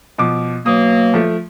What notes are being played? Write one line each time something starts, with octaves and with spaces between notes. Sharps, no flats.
B2 F3 D6
B2 F#3 A#3 D#6
F3 A3